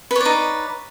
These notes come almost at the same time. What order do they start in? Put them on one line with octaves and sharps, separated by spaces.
B4 C#5 D5 D#4